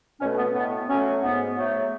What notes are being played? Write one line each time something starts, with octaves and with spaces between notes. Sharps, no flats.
B2 A3 C#4
B3
A2 B3
F#3 A3 C#4
G#2 B3
F#3 A3